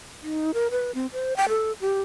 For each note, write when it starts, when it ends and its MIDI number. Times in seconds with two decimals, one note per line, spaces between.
0.23 0.52 63
0.54 0.68 70
0.71 0.91 71
0.95 1.07 60
1.13 1.36 72
1.36 1.49 79
1.49 1.72 69
1.81 2.01 67